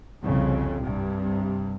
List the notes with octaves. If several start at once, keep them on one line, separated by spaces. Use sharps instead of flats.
C2 F2 C#3
G2 C3